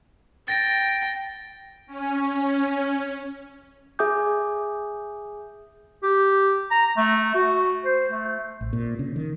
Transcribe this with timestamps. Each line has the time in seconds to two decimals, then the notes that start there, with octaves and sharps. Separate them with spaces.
0.48 G5 A6 A#6 D7
1.86 C#4
3.99 G#4 E5 G#5 D6 D#6 G6
6.03 G4
6.71 A#5
6.97 A3
7.35 F#4
7.85 C5
8.11 A3
8.61 A1
8.73 A#2
8.99 C#3
9.16 D#3